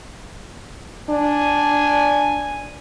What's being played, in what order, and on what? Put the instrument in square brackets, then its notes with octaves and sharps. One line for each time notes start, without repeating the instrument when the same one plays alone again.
[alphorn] D4 [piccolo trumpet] G#5